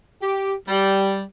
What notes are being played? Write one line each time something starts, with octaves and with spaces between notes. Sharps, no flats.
G4
G3